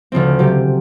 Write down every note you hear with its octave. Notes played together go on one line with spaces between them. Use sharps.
D2 C#3 F3 C4
C3 F#3 G4